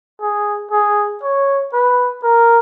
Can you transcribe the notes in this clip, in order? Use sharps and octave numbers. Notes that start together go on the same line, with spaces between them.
G#4
G#4
C#5
B4
A#4